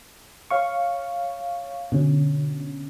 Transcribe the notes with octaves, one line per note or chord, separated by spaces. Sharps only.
C#5 F5 C#6
B2 D3 C#4